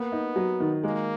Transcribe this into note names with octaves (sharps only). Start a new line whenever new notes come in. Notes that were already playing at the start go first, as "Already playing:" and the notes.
Already playing: A#3 B3
D#4
F#3
D#3
G#3 A#3